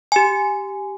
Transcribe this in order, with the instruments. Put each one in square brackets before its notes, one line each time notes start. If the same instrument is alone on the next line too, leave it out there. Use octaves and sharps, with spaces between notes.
[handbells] G4 G#5